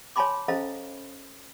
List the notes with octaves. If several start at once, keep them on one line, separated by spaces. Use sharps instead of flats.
C#5 G#5 A5 B5 C6 D6
C#4 A4 C5 D#5 F5 A#5